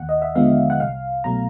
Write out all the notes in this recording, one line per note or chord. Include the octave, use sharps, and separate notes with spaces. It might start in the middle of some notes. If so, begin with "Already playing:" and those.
Already playing: D#2 F#5
D#5
E5
D3 F3 G#3 B3 F5
F#5
C2 F5
B2 F#3 A3 A#5